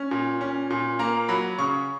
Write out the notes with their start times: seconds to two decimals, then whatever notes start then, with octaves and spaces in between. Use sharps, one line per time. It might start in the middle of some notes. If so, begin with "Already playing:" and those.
Already playing: C#4
0.11 A#2
0.41 C#4
0.70 A#2
0.99 A#3 A#5
1.28 F#3 B5
1.58 C#3 C#6